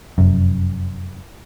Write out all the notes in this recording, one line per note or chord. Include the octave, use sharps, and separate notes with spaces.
F1 F#2